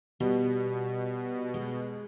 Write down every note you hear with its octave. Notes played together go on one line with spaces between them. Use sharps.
B2 G3
G#3